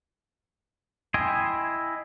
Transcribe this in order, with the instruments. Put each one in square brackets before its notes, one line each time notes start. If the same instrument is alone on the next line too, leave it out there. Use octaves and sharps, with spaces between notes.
[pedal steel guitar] E4 D#5 G5 G#5 C6